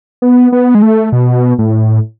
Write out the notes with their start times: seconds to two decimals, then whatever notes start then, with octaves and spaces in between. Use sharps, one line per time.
0.22 B3
0.52 B3
0.75 G#3
0.82 A3
1.12 B2
1.59 A2